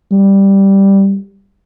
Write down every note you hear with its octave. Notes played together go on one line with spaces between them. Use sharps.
G3